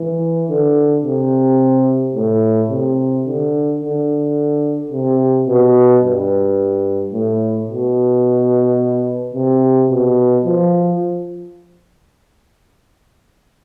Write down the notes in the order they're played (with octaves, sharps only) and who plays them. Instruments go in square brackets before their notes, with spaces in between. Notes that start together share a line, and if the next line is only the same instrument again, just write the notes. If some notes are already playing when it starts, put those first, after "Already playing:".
Already playing: [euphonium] E3
D3
C3
A2
C3
D3
D3
C3
B2
G2
A2
B2
C3
B2
F3